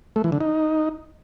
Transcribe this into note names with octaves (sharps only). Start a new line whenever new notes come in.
A3
E3
D3
D#4